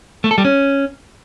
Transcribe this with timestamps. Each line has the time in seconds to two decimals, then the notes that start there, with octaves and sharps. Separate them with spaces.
0.24 A3
0.31 A4
0.38 G3
0.45 C#4